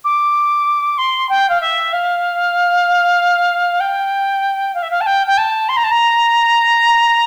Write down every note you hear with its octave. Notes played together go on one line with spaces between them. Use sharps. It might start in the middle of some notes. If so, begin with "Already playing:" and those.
D6
C6
G5
F5
E5
F5
G5
F5
E5
F5
A5
G5
G5
A5
C6
A#5
A5
A#5